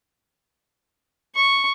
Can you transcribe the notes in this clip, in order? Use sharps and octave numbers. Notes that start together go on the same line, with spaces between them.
C#6